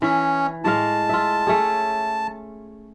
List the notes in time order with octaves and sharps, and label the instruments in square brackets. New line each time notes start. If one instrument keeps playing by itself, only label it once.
[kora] E3 [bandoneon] C#4
[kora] A2 G#3 F5 [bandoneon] A5
[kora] F4 E5
A3 C#4 G#4